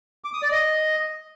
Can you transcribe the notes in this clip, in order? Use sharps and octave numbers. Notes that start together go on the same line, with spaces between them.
D6
D#6
D5
D#5